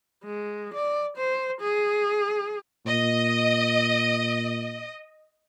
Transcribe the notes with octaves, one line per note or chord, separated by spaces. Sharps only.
G#3
D5
C5
G#4
A#2 D#5